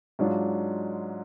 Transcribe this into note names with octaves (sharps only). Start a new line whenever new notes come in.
G#2 F#3 D4 F4